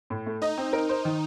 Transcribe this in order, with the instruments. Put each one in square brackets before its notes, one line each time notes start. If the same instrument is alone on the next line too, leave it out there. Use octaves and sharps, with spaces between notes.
[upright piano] A2
A3
[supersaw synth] D#4 [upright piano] D#5
[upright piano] C4
A#4
C5
D#3